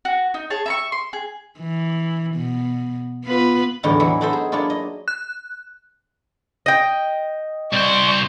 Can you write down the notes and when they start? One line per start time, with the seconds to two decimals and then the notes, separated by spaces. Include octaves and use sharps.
0.05 F#4
0.34 D#4
0.50 G#4 C#5 A5
0.66 E5 B5 C#6
0.92 C6
1.13 G#4
1.60 E3
2.36 B2
3.25 B3 F4 B4
3.83 E2 A2 D3 G3 D#4 E4
4.00 E3 F#3 E4
4.21 B3 D#4 A4 C5 E5
4.33 G#4
4.52 F#3 A#3 D4 E4 F4
4.70 D#5
5.08 F#6
6.66 D#5 G5
7.73 C2 C5 D5 C#6